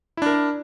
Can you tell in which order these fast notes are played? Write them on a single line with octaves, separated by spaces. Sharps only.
E4 D4 A#4